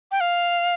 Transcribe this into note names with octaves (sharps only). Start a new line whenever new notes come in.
G5
F5